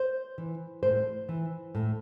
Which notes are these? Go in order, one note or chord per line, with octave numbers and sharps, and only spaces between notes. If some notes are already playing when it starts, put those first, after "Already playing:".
Already playing: C5
E3
A2 C5
E3
A2